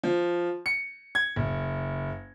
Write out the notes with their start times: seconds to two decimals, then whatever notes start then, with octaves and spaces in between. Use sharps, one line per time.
0.03 F3
0.66 C#7
1.15 G#6
1.36 F#1